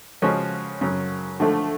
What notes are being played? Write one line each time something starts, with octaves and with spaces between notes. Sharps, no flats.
C#3 F3 G#3 C#4 F#4
F#2 C#3 F#3
D3 F3 A3